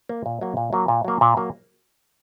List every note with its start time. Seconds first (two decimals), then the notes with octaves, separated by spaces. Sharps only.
0.09 A#3
0.26 A#2
0.41 F#3 A#3
0.57 A#2
0.73 F#3 A#3
0.88 A#2
1.05 F#3 A#3
1.21 A#2
1.37 F#3 A#3